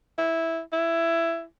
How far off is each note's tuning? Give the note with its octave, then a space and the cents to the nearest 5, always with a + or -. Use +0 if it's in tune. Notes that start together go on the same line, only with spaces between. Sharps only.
E4 -5
E4 +15